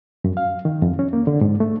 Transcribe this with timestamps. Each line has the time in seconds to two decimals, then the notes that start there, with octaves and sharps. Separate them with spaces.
0.24 F#2
0.37 F5
0.65 D#3
0.82 F2
0.99 C#4
1.13 A#3
1.27 D3
1.41 G#2
1.60 A3